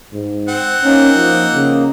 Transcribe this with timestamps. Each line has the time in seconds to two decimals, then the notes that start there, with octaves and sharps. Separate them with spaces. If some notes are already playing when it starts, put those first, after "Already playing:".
0.14 G#2
0.49 C4 F#5
0.84 A#3 C#4 D#4
1.16 F3
1.54 C#3